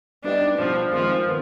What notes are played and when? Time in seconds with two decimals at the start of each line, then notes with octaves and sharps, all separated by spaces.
0.24 G3 B3 D4 D#4 G4
0.58 B2 F3 G3 D4 G4
0.92 D#3 F3 G#3 C4
1.26 D#3 B3